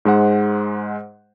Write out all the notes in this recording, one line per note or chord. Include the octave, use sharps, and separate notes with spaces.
G#2 G#3 C5 F#5